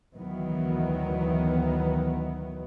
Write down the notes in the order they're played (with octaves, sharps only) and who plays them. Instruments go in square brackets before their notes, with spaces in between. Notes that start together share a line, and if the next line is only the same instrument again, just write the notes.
[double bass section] D2 D#3 E3 F#3 B3